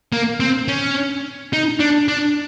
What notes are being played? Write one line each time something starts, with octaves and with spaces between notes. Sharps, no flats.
A#3
C4
C#4
D#4
D4
D4